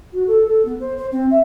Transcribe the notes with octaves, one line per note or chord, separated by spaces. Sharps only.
F#4
A4
A4
B3
C5
C5
C4
E5